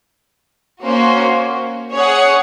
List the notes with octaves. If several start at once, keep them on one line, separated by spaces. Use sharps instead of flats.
A#3 C#4 F#4 C5
C#4 G#4 C#5 F#5